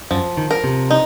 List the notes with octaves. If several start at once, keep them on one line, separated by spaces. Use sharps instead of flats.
F#2 F3
D#3
A#4
C3
D#4